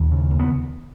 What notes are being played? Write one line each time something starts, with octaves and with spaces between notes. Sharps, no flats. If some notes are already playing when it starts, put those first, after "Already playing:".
Already playing: D#2 A#2 A#3
C#3
D#2
B3